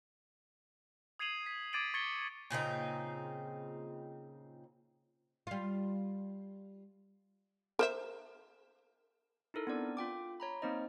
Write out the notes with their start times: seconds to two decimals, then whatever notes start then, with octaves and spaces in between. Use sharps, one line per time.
1.19 D#6 G#6 C7 D#7 F7 F#7
1.46 B6
1.73 D6 G#6 A6 D7 D#7 F#7
1.94 C#6 G#6 A6 B6 C#7 G7
2.50 A#2 C#3 C4 D#4
5.47 G3 F4
7.79 A#4 C5 E5
9.54 D#4 E4 A4 A#4
9.67 B3 C4 D4 D5
9.97 F4 G5 D6
10.40 C#5 A#5 B5
10.62 A#3 C4 D#4 C5 D#5